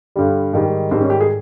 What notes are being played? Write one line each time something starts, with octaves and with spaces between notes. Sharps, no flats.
G2 D3 G3
G#2 D#3 G3
G#2 D#3 G3 C4
C#4
G4
G#4